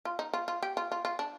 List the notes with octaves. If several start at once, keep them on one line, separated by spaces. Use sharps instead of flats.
F4
D#4
F4
F4
G4
F4
F4
F4
D4